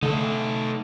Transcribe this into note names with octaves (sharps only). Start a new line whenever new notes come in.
D3 A3 D#4 A4